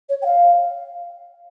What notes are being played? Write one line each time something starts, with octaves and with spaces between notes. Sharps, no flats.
C#5
G5
F5